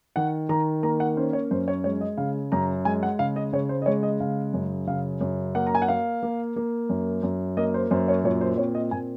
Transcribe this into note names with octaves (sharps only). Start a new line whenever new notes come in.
D#3 F#5
D#3 A#5
A#3 A#5
F#5
C#4 C5
C#5
F#2 C5
C#5
G#3 C#5
D#5
C#3 F5
F#2 A#5
G#3 G#5
F#5
C#3 F5
D#5
C#3 C#5
C5
D#5
G#3 C#5
D#5
C#3 F5
F#2
C#3 F5
F#2
A#3 F#5
A#5
G#5
F#5
A#3 F5
A#3
A#3
F#2
F#2
A#3 D#5
C5
F#2 C5
C#5
A#2 C#5
C5
C4 C#5
D#5
A#2 G#5